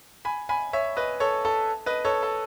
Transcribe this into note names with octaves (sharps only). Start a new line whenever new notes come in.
G#5 B5
G#5 B5
C#5 E5
B4 D#5
A4 C#5
A4
B4 D#5
A4 C#5
A4